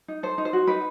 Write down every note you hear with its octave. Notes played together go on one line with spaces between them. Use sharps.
D#4
A4 C5
D#4
C5
F#4
D#4 B4